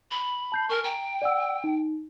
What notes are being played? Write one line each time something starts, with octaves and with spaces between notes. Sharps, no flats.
B5
A5 G6 C7
A#4 G#5 C#6
G5 A#5
D5 F#5 E6
D#4